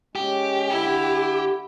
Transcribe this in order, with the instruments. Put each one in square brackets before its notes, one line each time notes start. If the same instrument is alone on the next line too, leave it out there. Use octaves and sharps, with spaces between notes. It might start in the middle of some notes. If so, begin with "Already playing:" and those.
[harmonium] G#3 C#4 [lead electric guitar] G4
[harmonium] D3 [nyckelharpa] E4